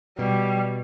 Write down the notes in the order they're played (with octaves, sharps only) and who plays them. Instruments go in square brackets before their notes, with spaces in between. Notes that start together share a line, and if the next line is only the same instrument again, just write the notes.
[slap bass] B2 [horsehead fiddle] G3